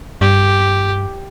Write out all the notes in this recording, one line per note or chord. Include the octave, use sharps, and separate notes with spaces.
G2 G4